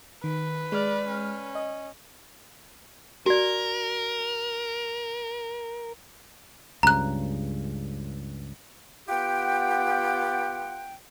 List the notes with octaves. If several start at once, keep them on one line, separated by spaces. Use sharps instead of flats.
D#3 B4
G#3 D5 F6
C#4
D#5
F#4 A#4 D5
C#2 G2 C#3 A#5 F#6
B3 F4 G4 F#5 G5